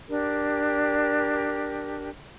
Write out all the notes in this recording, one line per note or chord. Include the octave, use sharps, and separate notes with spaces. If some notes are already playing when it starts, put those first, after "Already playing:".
D4 G4 A#4